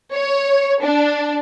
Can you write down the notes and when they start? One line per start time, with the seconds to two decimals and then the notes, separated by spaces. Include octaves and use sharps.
0.14 C#5
0.84 D4